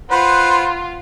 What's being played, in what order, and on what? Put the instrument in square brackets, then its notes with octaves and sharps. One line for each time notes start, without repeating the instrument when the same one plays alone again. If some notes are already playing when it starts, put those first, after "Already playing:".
[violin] F4 [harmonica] B4 C5 F#5